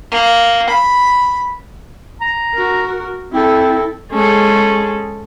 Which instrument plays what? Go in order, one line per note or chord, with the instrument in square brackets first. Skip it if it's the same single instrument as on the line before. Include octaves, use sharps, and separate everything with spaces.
[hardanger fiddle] A#3
B5
[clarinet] A#5
[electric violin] F#4 A#4
[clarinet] C4 [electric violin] E4 A4
[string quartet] G#3 C#4 G#4 A4